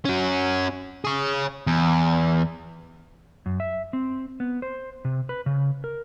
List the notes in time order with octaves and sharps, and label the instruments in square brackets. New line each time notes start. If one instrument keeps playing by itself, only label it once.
[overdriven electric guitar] C#4 F#4
G#4 C#5
E2
[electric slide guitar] F#2
E5
C4
B3
C5
C3
B4
C#3
A#4